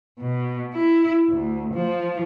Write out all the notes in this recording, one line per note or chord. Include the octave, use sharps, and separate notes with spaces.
B2
E4
D2
F3